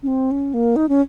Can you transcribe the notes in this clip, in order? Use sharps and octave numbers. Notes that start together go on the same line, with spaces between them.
C#4
C4
C#4
A#3
D#4
C#4